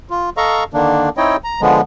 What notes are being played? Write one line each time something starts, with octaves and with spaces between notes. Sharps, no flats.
F4
A4 D#5 F5 A#5 C#6
D3 D#3 A#3 D4
C4 D#4 E4 C#5 D#5 G5
A#5
D3 F3 G#3 B3